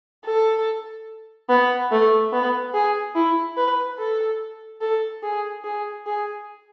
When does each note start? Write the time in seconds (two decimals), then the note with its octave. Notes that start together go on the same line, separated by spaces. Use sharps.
0.25 A4
1.49 B3
1.92 A3
2.33 B3
2.74 G#4
3.15 E4
3.57 B4
3.99 A4
4.81 A4
5.23 G#4
5.64 G#4
6.06 G#4